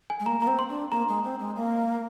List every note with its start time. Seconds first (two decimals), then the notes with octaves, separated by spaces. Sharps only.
0.10 G#5
0.20 G#3
0.26 A#3 A#5
0.40 A#3 A#5
0.47 C4
0.59 C6
0.69 D4
0.91 A#3 A#5
1.08 G#3
1.24 C4
1.40 G#3
1.56 A#3